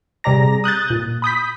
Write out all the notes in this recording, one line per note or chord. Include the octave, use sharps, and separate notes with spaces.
C3 G3 G#4 D5 A#5 A#6
D#6 F#6 G6 A6
A#2
B5 D#6 G6 B6